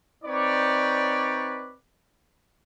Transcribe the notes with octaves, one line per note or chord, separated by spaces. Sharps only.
C4 D#4 B4 C#5 D5